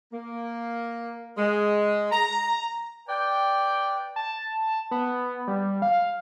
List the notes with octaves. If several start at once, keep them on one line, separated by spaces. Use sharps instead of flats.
A#3
G#3
A#5
B4 D5 G5
A5
B3
G3
F5